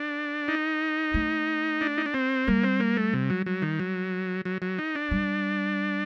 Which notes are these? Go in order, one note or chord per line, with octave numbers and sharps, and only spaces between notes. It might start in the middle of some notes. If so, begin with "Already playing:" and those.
Already playing: D4
D#4
A3
D4
D#4
D4
C4
G3 A#3
C4
A#3
A3
C3
F#3
F#3
D#3
F#3
F#3
F#3
D#4
D4
G3